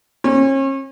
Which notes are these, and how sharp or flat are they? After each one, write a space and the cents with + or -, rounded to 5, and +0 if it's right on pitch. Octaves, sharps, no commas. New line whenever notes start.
C#4 -40